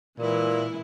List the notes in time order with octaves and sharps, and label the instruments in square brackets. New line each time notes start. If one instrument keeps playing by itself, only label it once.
[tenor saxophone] A#2 [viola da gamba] E3 G#3 E4